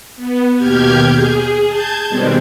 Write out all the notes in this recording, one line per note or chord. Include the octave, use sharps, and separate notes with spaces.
B3
D#2 B2 G4 F6 G6 G#6
G#4
A5 G6 G#6
B2 D#3 G3 G#3 B3 C4